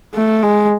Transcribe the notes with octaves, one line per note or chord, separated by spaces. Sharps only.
A3
G#3